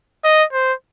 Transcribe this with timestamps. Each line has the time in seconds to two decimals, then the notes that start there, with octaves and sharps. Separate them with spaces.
0.24 D#5
0.53 C5